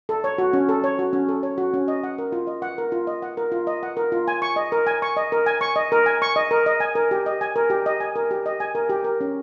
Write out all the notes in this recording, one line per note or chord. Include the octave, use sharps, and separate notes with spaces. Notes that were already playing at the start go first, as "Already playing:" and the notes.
A4
C#5
F#4
C#4
A4
C#5
F#4
C#4
A4
C#5
F#4
C#4
D#5
F#5
A#4
F4
D#5
F#5
A#4
F4
D#5
F#5
A#4
F4
D#5
F#5
A#4
F4
G#5
C#6
D#5
A#4
G#5
C#6
D#5
A#4
G#5
C#6
D#5
A#4
G#5
C#6
D#5
A#4
D#5
G#5
A#4
G4
D#5
G#5
A#4
G4
D#5
G#5
A#4
G4
D#5
G#5
A#4
G4
A#4
C#4